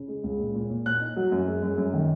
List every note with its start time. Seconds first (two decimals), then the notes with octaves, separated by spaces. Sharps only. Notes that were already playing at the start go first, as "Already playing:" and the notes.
Already playing: C#3
0.08 G#3
0.24 C#2
0.39 A#2
0.55 A#2
0.70 A#2
0.86 A#2 F#6
1.01 D#4
1.16 F#3
1.32 F#2
1.47 G#3
1.63 F#2
1.78 F#2
1.93 D#3